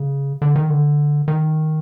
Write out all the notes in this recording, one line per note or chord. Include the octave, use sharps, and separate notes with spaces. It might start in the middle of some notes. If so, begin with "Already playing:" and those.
Already playing: C#3
D3
D#3
D3
D#3